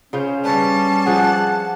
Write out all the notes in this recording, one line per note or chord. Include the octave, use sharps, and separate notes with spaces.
C#3 C#4 F4 C5
G3 D4 B4 C#5 A5
F3 G#4 F#5